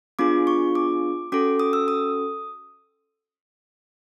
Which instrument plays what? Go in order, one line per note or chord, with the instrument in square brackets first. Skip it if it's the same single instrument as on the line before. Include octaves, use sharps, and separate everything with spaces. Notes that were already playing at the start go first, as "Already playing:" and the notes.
[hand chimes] B3 D4 F4 G#4 D6
C#6
D6
C#4 F#4 A4 D6
D#6
E6
D#6